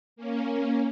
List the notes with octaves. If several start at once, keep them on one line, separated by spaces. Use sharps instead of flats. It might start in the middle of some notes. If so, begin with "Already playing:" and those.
A#3 C#4